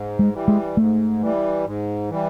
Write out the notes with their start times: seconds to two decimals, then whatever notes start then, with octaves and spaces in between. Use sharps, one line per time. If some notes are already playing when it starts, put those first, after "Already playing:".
Already playing: G#2
0.19 G#3
0.33 E3 G3
0.48 G#3
0.77 G#2 A3
1.21 E3 G3
1.66 G#2
2.10 E3 G3